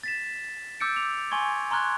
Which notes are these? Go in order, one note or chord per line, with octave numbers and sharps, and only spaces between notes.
A6 B6 E7
D6 E6 G6 A6 C#7 D7
F7
G#5 C6 C#6 G#6
A#5 C6 C#6 F6 F#6 G#6